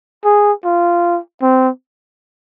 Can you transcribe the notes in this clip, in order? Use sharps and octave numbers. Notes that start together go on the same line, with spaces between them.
G#4
F4
C4